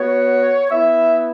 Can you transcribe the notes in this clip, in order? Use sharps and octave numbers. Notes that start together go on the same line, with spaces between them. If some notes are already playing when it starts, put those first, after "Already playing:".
Already playing: B3 F#4 C#5
B3 E4 E5